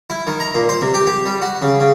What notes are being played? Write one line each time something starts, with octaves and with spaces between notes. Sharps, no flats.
E4
D#3
A#5
A#2
C5
C3
G4
G4
G3
F#4
C#3
C#3